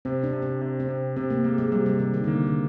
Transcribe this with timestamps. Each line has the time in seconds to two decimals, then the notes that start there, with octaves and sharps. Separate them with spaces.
0.05 C3 C4
0.23 D4
0.33 C3
0.42 C4
0.61 C3
0.80 C4
0.89 C3
1.16 C3 C4
1.30 A#3
1.44 G#3 A#3
1.58 G#3
1.72 C3 G3
1.86 G3
2.00 C3 D#3
2.14 D#3
2.24 D3 A#3
2.47 D3